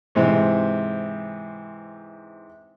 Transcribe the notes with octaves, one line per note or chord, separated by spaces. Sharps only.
G#2 C3 E3 C4